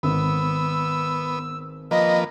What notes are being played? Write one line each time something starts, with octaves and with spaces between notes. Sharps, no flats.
G#1 B3 E6
F3 A#3 B4 D#5